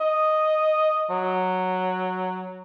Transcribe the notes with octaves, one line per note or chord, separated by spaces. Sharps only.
D#5
F#3